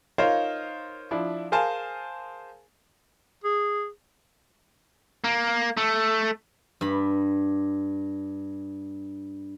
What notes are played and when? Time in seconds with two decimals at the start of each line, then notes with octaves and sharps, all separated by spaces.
0.18 D#4 F4 A#4 C5 C#5 F5
1.11 F3 D4 E4
1.52 G#4 A#4 C5 F5 G#5 A5
3.44 G#4
5.24 A#3
5.77 A3
6.81 G2 B5